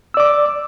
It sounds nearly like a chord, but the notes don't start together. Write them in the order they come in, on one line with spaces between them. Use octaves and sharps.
E6 D5 D6